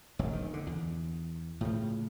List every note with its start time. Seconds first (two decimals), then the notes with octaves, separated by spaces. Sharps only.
0.19 E1 A#1 F#3
0.33 D#3
0.54 D3
0.67 E2
1.61 A2 C#3 F3